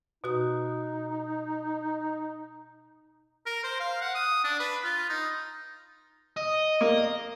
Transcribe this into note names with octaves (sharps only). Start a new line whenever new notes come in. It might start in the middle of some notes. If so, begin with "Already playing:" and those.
B2 D#4 F#4 D#6
A#4
C5
F5
F#5
D#6
D4
B4
F4
D#4
D#5
A#3